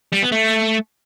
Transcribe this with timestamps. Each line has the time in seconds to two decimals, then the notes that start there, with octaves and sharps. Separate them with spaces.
0.12 G3
0.22 B3
0.32 A3